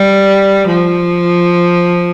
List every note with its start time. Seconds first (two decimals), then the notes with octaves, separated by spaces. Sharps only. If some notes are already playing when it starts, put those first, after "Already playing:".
Already playing: G3
0.68 F3